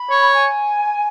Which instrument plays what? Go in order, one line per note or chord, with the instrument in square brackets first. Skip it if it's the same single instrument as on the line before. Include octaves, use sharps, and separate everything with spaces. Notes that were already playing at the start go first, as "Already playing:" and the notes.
Already playing: [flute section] B5
[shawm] C#5
[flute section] G#5